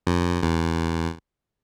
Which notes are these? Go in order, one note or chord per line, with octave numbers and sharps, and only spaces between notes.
F2
E2